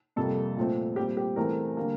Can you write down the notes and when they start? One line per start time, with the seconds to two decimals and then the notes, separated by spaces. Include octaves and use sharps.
0.16 F2 C3 G3 A#3 A4
0.56 A#2 F3 A3 C4
0.96 A#2 G3 C4 G4
1.17 G4
1.36 E2 E3 A3 C4 A#4
1.77 D3 G3 A#3